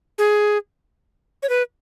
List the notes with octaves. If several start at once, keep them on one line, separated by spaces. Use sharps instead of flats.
G#4
C#5
B4